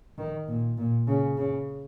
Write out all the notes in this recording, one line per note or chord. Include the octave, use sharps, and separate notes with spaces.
D#3
A#2
A#2
C#3
C#3